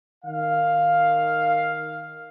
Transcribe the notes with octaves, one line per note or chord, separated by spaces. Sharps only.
D#3 F5